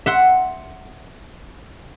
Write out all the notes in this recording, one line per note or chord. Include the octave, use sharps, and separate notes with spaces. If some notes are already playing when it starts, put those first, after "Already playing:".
E5 F#5 C6